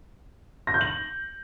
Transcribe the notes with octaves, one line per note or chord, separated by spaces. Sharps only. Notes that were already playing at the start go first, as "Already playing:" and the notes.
A#6
G6
F#7